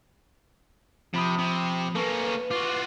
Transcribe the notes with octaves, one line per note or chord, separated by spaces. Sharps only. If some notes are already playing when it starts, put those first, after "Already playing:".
C3 F3 B5 D#6
C3
A#3 C#4 A4 B4
F4 F#4 D6